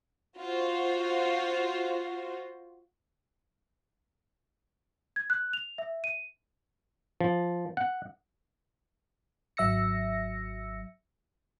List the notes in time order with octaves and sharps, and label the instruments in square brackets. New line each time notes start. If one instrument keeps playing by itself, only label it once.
[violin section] F4 F#4 C5
[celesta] G#6
F#6
F7
E5
D#7
[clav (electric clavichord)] F3
F#5
[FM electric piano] G#1 F#3 E5 E6 A#6 C#7